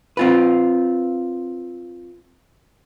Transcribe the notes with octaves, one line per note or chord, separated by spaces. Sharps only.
C4 F4 B4